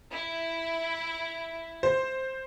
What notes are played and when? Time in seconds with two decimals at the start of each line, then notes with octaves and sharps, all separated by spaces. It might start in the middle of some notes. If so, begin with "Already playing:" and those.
0.11 E4
1.83 C5